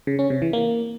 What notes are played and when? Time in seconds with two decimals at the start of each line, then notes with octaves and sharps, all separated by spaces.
0.07 C#3
0.19 C#4
0.30 C3
0.42 E3
0.53 A#3